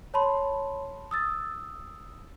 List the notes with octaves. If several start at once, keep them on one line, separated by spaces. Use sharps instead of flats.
C#5 A5 B5 C6
D#6 E6 A6